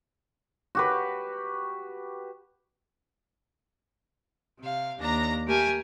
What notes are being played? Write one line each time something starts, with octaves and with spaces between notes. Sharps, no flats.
F#4 G4 B4
C3 F5
D#2 D4 A#5 A#6
A3 G4 A#4 G#5 A5